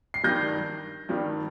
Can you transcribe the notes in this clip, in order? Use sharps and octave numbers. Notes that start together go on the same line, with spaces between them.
C7
G2 D#3 G3 G6 A#6
G2 D#3 G3